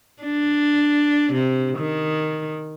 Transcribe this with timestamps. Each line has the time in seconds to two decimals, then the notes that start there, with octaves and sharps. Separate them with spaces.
0.23 D4
1.33 C3
1.78 D#3